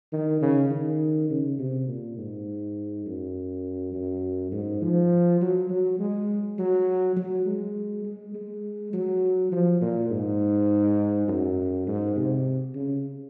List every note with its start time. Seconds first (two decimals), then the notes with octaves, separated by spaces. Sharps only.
0.13 D#3
0.42 C#3
0.70 D#3
1.30 C#3
1.59 C3
1.88 A#2
2.18 G#2
3.06 F#2
3.94 F#2
4.52 G#2
4.82 F3
5.41 F#3
5.69 F#3
5.99 G#3
6.59 F#3
7.17 F#3
7.46 G#3
8.05 G#3
8.35 G#3
8.93 F#3
9.52 F3
9.81 A#2
10.10 G#2
11.28 F#2
11.87 G#2
12.16 C3
12.74 C#3